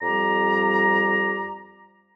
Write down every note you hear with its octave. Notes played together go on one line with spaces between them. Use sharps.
F2 G3 G4 D5 A#5